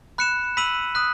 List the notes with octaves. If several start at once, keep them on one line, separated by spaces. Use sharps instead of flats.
B5 F#6 C#7 E7
B5 E6 B6 D#7 F#7
D#6 F#6 B6